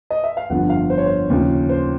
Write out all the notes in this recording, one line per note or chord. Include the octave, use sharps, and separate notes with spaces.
D#5
E5
F5
G1 F2 D3 F3 F#5
F5
C5
C#5
C5
D#2 C#3 F3
C5